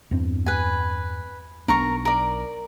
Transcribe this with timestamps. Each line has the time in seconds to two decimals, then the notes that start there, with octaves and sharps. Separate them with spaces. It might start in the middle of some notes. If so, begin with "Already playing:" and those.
0.11 E2 G2 C4
0.46 B4 G#5
1.68 B1 B3 D4 A#4 A#5 C#6
2.05 A#4 D5